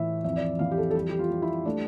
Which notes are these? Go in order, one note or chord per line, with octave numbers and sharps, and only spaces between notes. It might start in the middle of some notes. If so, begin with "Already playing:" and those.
Already playing: A2 E3 E5
F2 E5
D5
E5
E3 F5
G4
A4
A4
G3 G4
G4
F4
G3
E4
A3 D4